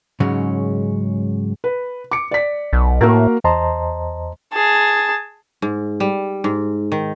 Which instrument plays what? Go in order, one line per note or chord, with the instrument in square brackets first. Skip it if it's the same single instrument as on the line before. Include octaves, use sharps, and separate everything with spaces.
[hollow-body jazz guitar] G#2 C#3 F#3 G#3 C#4
[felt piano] B4
D6 C#7
D5 B6
[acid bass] B1
[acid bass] A2 [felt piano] A#3 F#4 A#4
[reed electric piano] E2 C5 D#5 A5 A#5 C6
[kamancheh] G#4 A5
[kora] G#2
G3
G#2
D#3